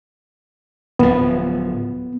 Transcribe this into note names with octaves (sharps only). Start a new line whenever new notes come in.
D1 F3 B3